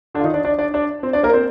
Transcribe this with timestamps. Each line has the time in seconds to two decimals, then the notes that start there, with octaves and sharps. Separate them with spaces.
0.15 D3 D4
0.19 F4
0.24 D#3 D#4
0.34 D4 D5
0.45 D4 D5
0.59 D4 D5
0.74 D4 D5
1.03 C4 C5
1.13 D4 D5
1.23 A#3 A#4
1.33 C4 C5